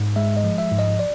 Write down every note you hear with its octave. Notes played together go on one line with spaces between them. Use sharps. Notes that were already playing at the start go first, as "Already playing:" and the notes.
Already playing: G#2
G#3 E5
D#5
F3
E5
G#2
D#5
D5